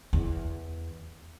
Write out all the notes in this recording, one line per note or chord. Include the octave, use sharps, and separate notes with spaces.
E2